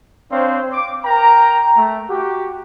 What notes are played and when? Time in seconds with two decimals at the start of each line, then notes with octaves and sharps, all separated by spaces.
0.31 C4 D4 C5 C#5 F5
0.73 D6
1.05 A#4 G5 A#5
1.77 A3
2.10 F#4 G4